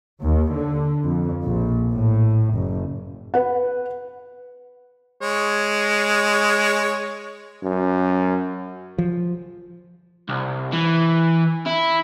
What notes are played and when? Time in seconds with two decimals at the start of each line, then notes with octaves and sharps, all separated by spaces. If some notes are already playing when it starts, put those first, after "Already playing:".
0.22 D#2
0.53 D3
1.04 F2
1.44 A#1
1.92 A2
2.55 F#1
3.34 B4 F#5
5.21 G#3 C#5
7.63 F#2
8.98 F3
10.29 C2
10.72 E3
11.67 E4